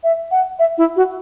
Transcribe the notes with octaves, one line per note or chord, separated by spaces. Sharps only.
E5
F#5
E5
E4
F#4